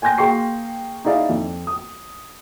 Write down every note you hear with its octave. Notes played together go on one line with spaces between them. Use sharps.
G5 G#5 C6 G6 A#6
A#3 G#4 G5 C6 C#6 C7
D#4 E4 G#4 D5 F5
F2
D#6